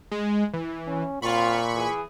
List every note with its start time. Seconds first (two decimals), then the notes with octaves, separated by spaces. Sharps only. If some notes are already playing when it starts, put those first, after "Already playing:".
0.12 G#3
0.54 E3
0.87 C#4
1.22 A#2 F#3 C4 F4 B5 C#6
1.75 E3 G#4